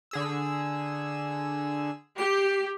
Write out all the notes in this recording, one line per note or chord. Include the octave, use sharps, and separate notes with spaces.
D3 G#4 E6
G4 C7